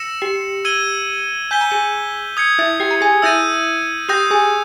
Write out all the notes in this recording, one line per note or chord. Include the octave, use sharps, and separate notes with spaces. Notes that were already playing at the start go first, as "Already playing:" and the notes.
Already playing: E6 A#6 C#7 E7
G4 G5
E6 G#6 D#7 G7
G#5 G6 B6 G7
A#5
G#4 G#5
D#6 G#6 C#7
E4 E5
G4 G5
A#5
G#4 G#5
E4 E5 E6 G6 A#6 D#7
G4 G5 D#6 G6 A#6
G#4 G#5